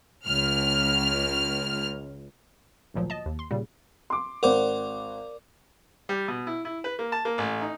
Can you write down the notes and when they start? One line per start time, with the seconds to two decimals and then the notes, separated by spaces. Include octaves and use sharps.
0.27 C#2 F6
2.94 G#1 D2 A#2 F3 F#3
3.10 D#5 A5
3.26 D#2
3.39 C6
3.51 A#2 C#3 G3
4.10 C6 D6
4.43 G#1 A#4 C5 D5 F#5 D6
6.09 G3
6.28 B2
6.47 E4
6.65 E4
6.84 B4
6.99 A#3
7.12 A5
7.25 A#3
7.38 A1
7.61 D#4